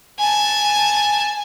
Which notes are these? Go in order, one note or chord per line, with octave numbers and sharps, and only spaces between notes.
G#5 A5